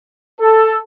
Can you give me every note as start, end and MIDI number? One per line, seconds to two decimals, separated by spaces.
0.40 0.77 69